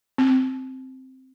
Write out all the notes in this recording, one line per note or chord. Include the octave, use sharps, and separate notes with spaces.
C4